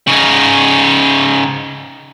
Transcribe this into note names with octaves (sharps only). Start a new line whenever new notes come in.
C#3 D#4